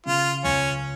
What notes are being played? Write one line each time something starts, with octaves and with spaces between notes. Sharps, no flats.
C#3 F4
C#2 C#4